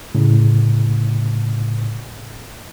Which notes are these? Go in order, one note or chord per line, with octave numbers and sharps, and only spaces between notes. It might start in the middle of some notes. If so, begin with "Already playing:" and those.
A2 C#3